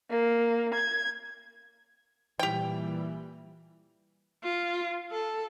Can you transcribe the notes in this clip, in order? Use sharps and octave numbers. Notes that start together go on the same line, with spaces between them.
A#3
G#6
A#2 E3 G3 G4 G5
F4
A4